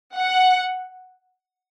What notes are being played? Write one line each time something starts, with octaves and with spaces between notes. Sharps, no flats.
F#5